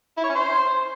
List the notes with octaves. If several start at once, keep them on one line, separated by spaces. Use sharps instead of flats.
E4
C#5
C#4
C5